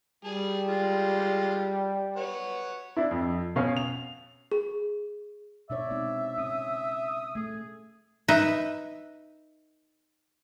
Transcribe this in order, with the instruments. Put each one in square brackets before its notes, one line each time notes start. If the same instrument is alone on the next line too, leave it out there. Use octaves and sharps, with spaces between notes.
[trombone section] G3 [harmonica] G#4 A5
[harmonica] G#3 F4
B4 C#5 F#5
[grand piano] D4 E4
F2
B2 C#4 F5
F7
[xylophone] G#4
[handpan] B2 D4 C#5 [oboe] D5 [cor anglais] E5
[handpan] G#3 C4 D#4
[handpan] C#4 [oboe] D#6
[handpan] A3 [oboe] G#4
[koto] D#4 B4 E5